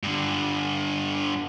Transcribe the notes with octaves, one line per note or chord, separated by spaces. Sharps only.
G2 D3